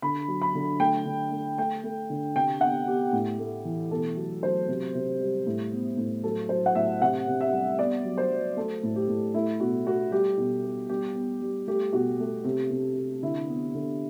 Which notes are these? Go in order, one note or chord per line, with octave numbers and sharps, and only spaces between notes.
D3 B5
F#3
B5
D3
A3 G5
D3
A3
A3 G5
A3
D3
C3 G5
B3 F#5
B3 G4
A2
A3
E3
B2 A4
F#3
F#3 C5
C3
C3
G3
A2
B3
A2
F#3 A4
F#3 C5
F#5
A2 E5
C3 F#5
C3
E5
G3
B3 D5
F#3
C5
F#3
A3 A4
A2
G4
A2
A3 E4
B2 F#4
A3 F#4
G3 G4
B2
B3
G3 G4
B3
G3
A3 G4
B2 F#4
A3
C3
C3
C3
D3 E4
B3
D3